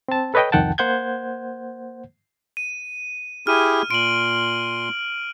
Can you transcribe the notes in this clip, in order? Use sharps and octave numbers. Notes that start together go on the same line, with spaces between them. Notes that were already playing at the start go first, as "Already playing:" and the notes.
C4 A5
A4 B4 C#5 D#5 G5
C2 F2 D#3 F#5 G5 A5
A#3 C5 F#5 G6 G#6
D#7
E4 G4 G#4 F6 D#7
A#2 C6 D7 F#7